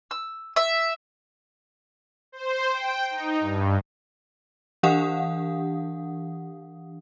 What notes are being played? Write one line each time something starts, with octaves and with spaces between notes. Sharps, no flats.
E6
E5
C5
G5
D#4
G2
E3 D4 G4 F5 F#5 D#6